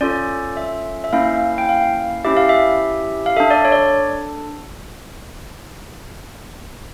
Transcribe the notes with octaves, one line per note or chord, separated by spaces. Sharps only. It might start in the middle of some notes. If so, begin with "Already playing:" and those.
C#4 F4 A4 D5
E5
E5
A#3 C#4 E4 F5
G5
F5
C#4 E4 G4 E5
F5
E5
F5
D4 A4 E5
D5
C#5
D5